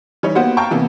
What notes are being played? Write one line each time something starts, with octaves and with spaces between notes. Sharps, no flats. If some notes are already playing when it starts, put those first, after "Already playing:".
E3 G3 D#4 C#5
A#3 B3 F#4 G4 C5 F#5
F5 G5 A5 A#5 C#6
C3 E3 A#3 B3